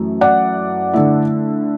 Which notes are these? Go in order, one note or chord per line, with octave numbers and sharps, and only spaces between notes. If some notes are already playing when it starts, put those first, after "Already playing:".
Already playing: F#2 E3 A3
D5 F#5
D3 A3 E4